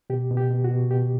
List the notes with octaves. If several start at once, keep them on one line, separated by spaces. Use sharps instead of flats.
B2 G4
B2
G4
B2
F#4
B2
B2 G4